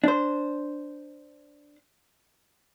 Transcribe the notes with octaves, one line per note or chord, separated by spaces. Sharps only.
D4 C5